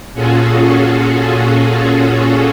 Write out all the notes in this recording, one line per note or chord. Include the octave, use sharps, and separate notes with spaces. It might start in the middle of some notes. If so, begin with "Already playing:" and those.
A#2 C#4 F4 F#4 G#4 A4